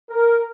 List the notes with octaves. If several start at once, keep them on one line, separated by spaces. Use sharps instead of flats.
A#4